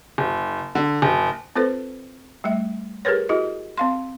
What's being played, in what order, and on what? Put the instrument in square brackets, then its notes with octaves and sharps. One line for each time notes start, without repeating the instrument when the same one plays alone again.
[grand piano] F#1
D3
F#1
[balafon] C4 F4 A4 B4 C5
G3 A3 E5
G4 G#4 A#4 B4 C#5
E4 F#4 G#4 D#5
C4 F5 C6